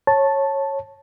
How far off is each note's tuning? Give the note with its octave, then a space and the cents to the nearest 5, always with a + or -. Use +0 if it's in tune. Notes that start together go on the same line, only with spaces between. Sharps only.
C#5 -15 A5 +0